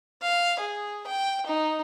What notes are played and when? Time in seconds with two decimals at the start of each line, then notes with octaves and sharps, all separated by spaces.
0.22 F5
0.60 G#4
1.07 G5
1.47 D#4